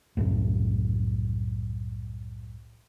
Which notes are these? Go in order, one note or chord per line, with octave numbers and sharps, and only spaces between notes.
C2 F#2 A2